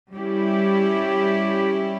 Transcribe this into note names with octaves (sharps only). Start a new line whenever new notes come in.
G3 C#4 E4 G4